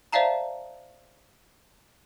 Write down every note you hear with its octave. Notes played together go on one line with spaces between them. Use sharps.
C5 D5 E5 F5 A5 A#5